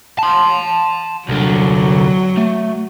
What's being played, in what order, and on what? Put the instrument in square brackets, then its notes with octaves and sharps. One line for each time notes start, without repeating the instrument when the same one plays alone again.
[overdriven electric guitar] A5 C6
[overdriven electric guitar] C2 D3 [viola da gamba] F#3
[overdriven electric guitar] A3